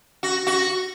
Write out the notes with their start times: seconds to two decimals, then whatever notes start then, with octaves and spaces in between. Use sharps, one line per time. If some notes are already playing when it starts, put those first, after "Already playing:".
0.23 F#4
0.47 F#4